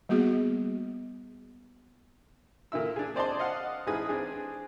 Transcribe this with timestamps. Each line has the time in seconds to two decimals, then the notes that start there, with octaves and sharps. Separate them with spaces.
0.09 G3 A#3 B3 F#4 G#4
2.72 A#2 D3 E4 E6
2.96 D4 G#4
3.15 C4 C5 D5 D#5 A5 C6
3.40 D#5 F5 F#5
3.87 A1 G#2 G#4 B4 D#6
4.09 C4 D4 G#4